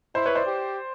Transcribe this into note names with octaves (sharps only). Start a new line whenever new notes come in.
E4 C5
B4 C#5
C5 D5
G4